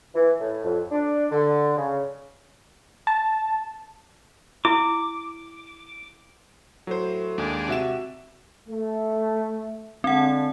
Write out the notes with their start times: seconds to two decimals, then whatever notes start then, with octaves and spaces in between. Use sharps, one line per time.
0.15 E3
0.40 A2
0.64 F2
0.91 D4
1.31 D3
1.77 C#3
3.07 A5
4.65 E4 D6
6.87 A2 F#3 C5
7.38 D#2 G#3 D4
7.68 C3 F#4 E5 E7
8.69 A3
10.04 D3 G#3 C4 D4 F#5